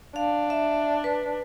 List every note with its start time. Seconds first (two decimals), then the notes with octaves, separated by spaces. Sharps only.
0.16 D4 F5
0.50 E5
1.04 B4